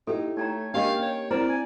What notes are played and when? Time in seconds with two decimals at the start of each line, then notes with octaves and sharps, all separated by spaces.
0.07 D#4 E4 G4 A4
0.37 A3 D#4 C#5 G5 A#5
0.74 A#3 C#4 D4 G4 D#5 F5 G5
1.02 C#5
1.31 C4 E4 A#4 C5 D5 A#5
1.49 G#5